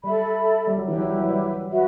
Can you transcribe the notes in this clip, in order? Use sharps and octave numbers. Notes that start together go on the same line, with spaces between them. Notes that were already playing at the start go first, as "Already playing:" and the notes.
G3 A4 E5 B5
G3
F#3
E3 E4 G4 B4
F#3
G3
F#3
G3
F#4 B4 E5